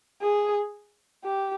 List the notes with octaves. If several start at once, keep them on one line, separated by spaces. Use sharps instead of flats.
G#4
G4